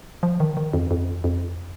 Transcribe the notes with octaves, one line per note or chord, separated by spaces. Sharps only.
F3
D#3
D#3
F2
F2
F2